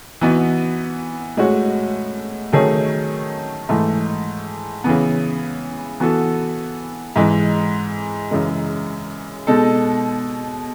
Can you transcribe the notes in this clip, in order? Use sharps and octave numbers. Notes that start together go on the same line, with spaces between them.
E3 B3 D#4 F#4
A2 G#3 C#4 F#4
D#3 F#3 A3 C#4 G#4
G#2 E3 A3
C#3 E3 B3
E3 B3 F#4 A4
G#2 E3 G#3
F#2 C#3 E3 G#3
B2 G#3 D#4 A4